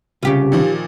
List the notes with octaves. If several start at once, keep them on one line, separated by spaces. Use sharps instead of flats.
C2 C#3 F4 G4
A#2 D#3 F3